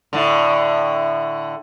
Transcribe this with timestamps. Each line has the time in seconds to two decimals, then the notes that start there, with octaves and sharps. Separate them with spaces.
0.13 A2 D3